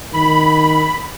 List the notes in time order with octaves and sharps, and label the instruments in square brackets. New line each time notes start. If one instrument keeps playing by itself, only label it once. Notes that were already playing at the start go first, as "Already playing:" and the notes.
[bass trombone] D#3 [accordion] B5